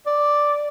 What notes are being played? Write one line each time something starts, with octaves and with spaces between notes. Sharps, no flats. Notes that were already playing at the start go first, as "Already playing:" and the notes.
D5